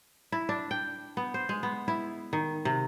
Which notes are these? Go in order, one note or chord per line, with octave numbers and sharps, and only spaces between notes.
E4
D4
G5
B3
C5
G#3
B3
E4
D#3
C3